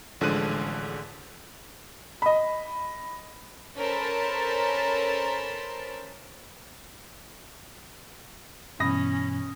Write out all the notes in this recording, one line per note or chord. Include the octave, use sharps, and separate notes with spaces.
A1 D3 F3 G#3 F#6 D#7
D#5 B5
C#4 A4 A#4 C5 A5 B5
G2 B2 E3 C#4 B5 D#6 A#6